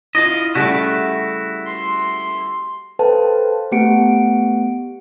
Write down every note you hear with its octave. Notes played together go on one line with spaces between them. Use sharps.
E4 F4 D#5
C#3 G3 A3 E4 F#4
C6
A4 B4 C5 F5 G5 A5
A3 B3 G4 F#5 C#7 D7